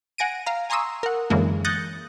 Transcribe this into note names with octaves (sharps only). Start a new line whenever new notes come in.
F#5 G#5 A#6 D7 D#7
F5 A#5
G#5 A#5 C6 C#6 D#6 E6
A#4 F#5
F#2 D3 E3 G#3 A#3
D#6 F#6 G6 A6 A#6 C#7